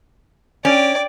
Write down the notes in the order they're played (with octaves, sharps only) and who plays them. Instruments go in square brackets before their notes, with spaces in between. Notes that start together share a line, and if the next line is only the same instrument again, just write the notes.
[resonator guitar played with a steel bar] C#4 [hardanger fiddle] D5 G5